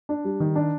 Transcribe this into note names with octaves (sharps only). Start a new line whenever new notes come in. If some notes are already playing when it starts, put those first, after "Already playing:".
D4
G3
D#3
D4